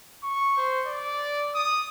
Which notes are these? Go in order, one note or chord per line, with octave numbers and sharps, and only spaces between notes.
C#6
C5
D5
D#6